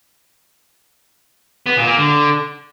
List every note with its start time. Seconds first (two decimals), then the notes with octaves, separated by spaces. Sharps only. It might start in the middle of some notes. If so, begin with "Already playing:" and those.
1.66 B3
1.77 A#2
1.87 A#3
1.97 D3